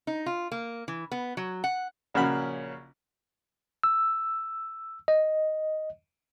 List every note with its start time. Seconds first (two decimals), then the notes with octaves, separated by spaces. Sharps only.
0.07 D#4
0.26 F4
0.52 A#3
0.88 E3
1.12 B3
1.37 F#3
1.64 F#5
2.14 A#1 C#3 A#3 C#4 F#4 B5
3.84 E6
5.08 D#5